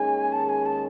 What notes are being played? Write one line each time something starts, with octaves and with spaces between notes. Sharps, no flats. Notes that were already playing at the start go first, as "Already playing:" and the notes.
Already playing: D#2 D#3 G#3 C#4 G#4 G#5
A5
G#5
A5